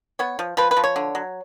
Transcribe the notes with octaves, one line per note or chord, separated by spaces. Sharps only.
B3 C#5
F3
F3 B4
B4
F3
C#5
D3
F#3